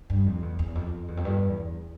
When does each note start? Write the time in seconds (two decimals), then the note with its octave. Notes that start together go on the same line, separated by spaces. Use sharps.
0.10 G2
0.26 F2
0.42 E2
0.59 E2
0.75 F2
1.08 E2
1.17 F2
1.25 G2
1.49 E2